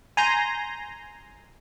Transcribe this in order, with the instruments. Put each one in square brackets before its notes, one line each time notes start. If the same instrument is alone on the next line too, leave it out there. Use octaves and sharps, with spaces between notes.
[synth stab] G#5 A#5 C6 G6 A#6